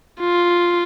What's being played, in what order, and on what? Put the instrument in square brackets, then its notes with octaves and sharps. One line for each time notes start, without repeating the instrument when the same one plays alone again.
[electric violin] F4